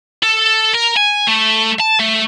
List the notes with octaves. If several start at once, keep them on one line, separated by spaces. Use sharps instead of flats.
A4
A#4
G#5
A3
A5
A3